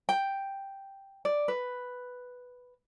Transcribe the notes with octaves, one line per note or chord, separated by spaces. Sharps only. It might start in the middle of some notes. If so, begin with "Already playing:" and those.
G5
D5
B4